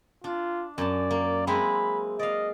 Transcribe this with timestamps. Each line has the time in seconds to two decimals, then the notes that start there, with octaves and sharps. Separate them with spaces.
0.24 D4 F4
0.78 F#2 D5 A5
1.11 A#3
1.47 G#3 C4 E4 B5
2.19 D5 D#5 F5